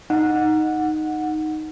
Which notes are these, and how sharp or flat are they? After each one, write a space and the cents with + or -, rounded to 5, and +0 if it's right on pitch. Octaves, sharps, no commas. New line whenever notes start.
D#4 +0 F#5 -10